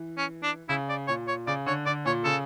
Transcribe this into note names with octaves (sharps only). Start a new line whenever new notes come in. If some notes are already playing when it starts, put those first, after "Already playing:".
Already playing: E3
C#4
D4
C#3 E4
D5
A#2 C#5
C#5
C#3 D5
D3 C#5
D3 D5
A#2 C#5
C#3 A4